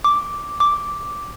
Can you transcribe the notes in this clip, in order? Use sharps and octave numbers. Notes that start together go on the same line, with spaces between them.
D6
D6